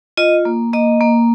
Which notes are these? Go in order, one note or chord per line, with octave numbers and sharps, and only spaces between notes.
F4 D#5
A#3
A#3 D#5
A#3